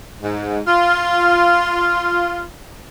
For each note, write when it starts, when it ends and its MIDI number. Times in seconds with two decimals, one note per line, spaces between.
0.22 0.60 44
0.67 2.42 65